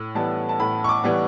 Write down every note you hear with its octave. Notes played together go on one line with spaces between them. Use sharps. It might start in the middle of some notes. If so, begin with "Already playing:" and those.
Already playing: A2
E3 G3 B3 A5
A5
A2 B5
C#6
D6
E3 G3 B3